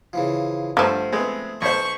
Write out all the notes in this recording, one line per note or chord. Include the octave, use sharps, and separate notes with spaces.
C#3 E3 F3
G2 D3 F3 A3
G#3 A3 B3 C4
B1 C5 C#6